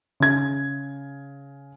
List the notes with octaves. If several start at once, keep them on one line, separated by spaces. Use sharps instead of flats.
C#3 G#6